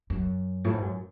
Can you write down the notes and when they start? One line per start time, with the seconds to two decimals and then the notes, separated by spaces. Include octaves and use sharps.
0.10 F#2
0.64 A2
0.73 G#2
0.82 F#2